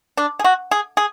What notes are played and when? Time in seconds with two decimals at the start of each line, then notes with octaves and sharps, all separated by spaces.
0.17 D4
0.39 G#4
0.44 F#4
0.71 G#4
0.97 G#4